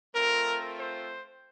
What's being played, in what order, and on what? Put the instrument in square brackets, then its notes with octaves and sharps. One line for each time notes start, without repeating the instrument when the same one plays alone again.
[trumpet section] A3 C4 F4 A#4
C5